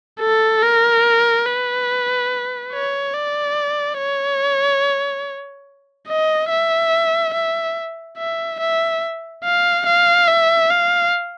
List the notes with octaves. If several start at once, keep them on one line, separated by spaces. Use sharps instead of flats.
A4
A#4
B4
C#5
D5
C#5
D#5
E5
E5
E5
E5
F5
F5
E5
F5